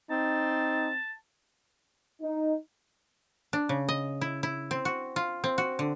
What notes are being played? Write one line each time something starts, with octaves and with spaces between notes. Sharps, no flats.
C4 D#4 A5
D#4
D4
C#3
D#5
E4
E4
C4
F#4
F4
C4
F#4
D3